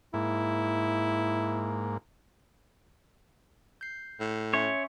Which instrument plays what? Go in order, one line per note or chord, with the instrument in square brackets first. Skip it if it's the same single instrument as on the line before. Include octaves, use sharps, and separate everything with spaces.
[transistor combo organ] G#2 A#3 [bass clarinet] E4
[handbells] G6 C7
[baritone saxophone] A2
[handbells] C#4 E5 C6 [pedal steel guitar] C#5